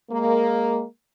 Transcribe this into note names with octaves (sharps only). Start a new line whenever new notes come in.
G#3 A#3